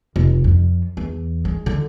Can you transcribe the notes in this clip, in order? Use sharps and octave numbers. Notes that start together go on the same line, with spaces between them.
F1
F2
E2
G#3
D3